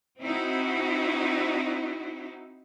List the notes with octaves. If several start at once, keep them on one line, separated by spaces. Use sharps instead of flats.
C4 D#4 E4 F#4